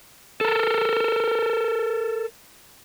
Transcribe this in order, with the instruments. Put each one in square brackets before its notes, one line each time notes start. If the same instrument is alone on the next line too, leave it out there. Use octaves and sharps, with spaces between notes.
[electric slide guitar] A4 A#4